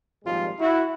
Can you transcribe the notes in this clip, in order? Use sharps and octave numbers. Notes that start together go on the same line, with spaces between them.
G#1 A#2 F3 G3 G#3 F4
E4 F#4